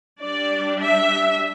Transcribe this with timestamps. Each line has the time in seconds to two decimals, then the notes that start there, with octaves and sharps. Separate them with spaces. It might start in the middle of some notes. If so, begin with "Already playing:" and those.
0.20 G3 D4 D5
0.80 E5